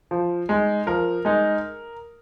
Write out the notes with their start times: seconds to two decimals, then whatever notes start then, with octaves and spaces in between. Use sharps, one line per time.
0.11 F3
0.49 G#3 D#4
0.87 F3 A#4
1.25 G#3 D#4